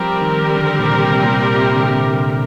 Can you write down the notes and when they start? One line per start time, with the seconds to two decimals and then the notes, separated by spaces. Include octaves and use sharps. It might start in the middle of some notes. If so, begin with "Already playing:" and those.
Already playing: F3 G3 C4 G4 A#4
0.22 D#3
0.56 D3
0.79 A#2
0.89 C3
1.12 C3
1.23 A#2
1.34 C3
1.40 A#2
1.56 C3
1.74 D3
1.91 C3
2.13 D3